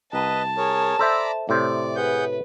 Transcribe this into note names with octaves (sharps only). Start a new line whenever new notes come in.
C2 B4 D#5 A5
G#4 A#4 C#5
A4 C5 D5 E5 A#5 B5
A2 C3 C5 D5
G#4 B4 F#5 G6